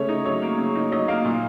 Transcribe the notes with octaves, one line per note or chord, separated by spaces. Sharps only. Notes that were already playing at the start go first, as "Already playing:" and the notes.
Already playing: C#3 A3 C#5
D#4
F#3 C#5
A#3
C#3
D#4
F#3 D#5
A#3 F5
A#2